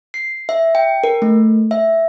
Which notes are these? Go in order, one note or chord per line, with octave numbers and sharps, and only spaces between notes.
C7
E5
G5
A#4
A3
E5